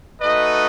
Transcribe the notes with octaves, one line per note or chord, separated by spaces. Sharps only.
A3 D#4 F#4 B4 D#5